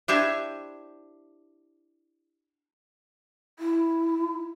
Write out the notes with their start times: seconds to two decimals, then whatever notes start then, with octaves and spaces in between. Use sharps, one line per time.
0.08 D4 E4 G4 C5 E5 G#5
3.59 E4